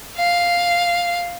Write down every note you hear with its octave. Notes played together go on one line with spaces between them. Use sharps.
F5